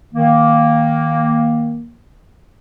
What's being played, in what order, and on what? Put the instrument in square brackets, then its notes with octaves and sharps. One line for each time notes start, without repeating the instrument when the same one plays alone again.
[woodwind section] D#3 A#3